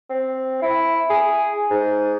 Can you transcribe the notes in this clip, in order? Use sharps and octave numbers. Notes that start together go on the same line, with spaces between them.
C4
E4
G#4
G#2